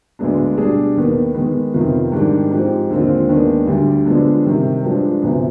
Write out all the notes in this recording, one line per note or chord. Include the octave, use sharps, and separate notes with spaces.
D2 D3 G#3 B3 D4
B2 G3 D4 G#4
D#2 D#3 B3
D#3 G#3 B3
F2 C3 D#3 B3 F4
G#2 D#3 G3 D4
G#2 F3 C4 G4
D#2 D3 G#3 C4 F4
D#2 D#3 G#3 B3 D4
D2 D3 G3
D3 F3 G#3 B3 D4
C3 D#3 G3
G2 F3 G#3 D4
D2 C3 F3 B3